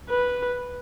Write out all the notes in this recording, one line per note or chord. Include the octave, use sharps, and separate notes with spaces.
B4